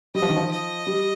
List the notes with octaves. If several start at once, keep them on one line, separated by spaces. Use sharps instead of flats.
G3 D#5
F3
D#3
F3
D#5
G3